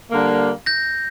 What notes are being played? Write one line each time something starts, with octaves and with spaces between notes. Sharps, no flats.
D3 G3 A#3
G6 A#6